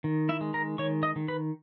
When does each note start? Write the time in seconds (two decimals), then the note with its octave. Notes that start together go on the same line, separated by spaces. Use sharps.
0.04 D#3
0.29 E4 E5
0.41 G#3
0.54 A#4 A#5
0.78 D#3 C#5 C#6
1.03 D#5 D#6
1.16 D#3
1.28 B4 B5